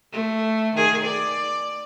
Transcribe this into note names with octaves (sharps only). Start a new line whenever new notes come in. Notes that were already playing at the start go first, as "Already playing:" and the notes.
A3
D#3 G#4
D5